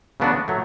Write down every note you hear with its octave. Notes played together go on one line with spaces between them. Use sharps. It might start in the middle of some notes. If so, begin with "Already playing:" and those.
C#3 F#3 B3 D4 F#4
F#3 A3